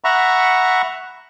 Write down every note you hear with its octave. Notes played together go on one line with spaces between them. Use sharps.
E5 F#5 A#5 B5 C#6